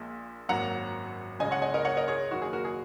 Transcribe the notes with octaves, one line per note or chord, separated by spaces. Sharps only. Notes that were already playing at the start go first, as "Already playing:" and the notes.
Already playing: A#1 A#2 G#3
G#1 F#2 F#3 A#3 F#5 A#5
C#2 C#3 G#3 D#5 G#5
C#5 F#5
D#5 G#5
A#4 D#5
C#5 F#5
A#4 D#5
G#4 C#5
F#1 F#2 D#3 A#3 F#4
G#4
F#4 A#4
G#4